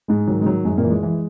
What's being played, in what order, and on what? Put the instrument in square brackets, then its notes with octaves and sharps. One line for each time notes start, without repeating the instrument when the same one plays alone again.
[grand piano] G#2 G#3
D#3 F#3
G#3
D#3 F#3
F#2 G#3
A#2 A#3
E3
G#3
E3